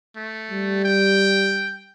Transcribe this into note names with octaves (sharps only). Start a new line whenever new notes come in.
A3
G3
G5